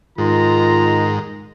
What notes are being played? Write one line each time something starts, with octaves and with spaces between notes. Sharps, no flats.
G#2 D#3 F4 A#5